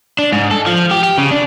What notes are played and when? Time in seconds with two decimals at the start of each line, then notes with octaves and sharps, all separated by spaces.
0.19 D4
0.32 G#2
0.51 A4
0.66 F3
0.91 G4
1.03 G4
1.18 C#3
1.31 D4